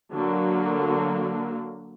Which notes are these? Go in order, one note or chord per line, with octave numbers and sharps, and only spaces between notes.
D3 F#3 A#3